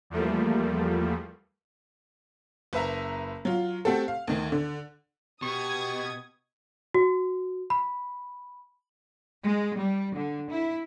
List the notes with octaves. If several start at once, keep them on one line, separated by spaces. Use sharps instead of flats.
E2 F3 G3 A3 A#3
F#1 B4 E5 A#5
F#3 F4
A3 C4 F#4 G4 A4
F5
D2 D#3
D3
B2 G4 C#6 D#6 G#6
F#4
B5
G#3
G3
D3
E4